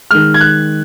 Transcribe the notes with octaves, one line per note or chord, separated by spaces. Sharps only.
D#3 G#3 F6
G#6
F#6